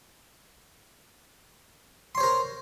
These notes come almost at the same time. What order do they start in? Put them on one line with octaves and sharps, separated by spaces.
C6 C#5 C5 A#4